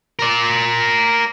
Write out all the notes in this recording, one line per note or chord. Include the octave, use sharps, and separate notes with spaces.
A#4 D5